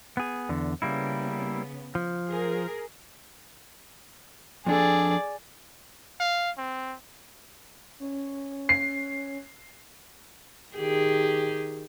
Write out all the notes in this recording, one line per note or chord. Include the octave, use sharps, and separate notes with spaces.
B3 G#4
E2 D3
C#3 G3 A#3 B3 E4
F3
G#4 A#4
F2 D4 G#4 A4 D5
F5
C4
C#4
C7
D#3 G4 G#4